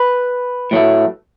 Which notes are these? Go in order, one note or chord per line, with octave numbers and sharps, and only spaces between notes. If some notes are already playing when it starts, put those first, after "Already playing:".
Already playing: B4
A2 F#3 A3